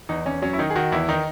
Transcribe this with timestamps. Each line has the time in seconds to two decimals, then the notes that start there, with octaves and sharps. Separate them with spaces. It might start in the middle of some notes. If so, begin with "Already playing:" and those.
0.09 E2 D#4
0.26 E2 C#4
0.42 F#3 C#4
0.53 E4
0.59 D#3 D#4
0.70 G#4
0.75 D#3 F#4
0.92 E2 E4
1.09 D#3 D#4